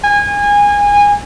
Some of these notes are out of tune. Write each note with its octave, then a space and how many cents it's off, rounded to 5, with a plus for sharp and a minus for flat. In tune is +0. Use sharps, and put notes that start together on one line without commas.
G#5 -25